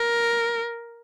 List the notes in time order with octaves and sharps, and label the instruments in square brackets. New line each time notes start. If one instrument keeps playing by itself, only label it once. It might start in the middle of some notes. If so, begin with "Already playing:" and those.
Already playing: [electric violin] A#4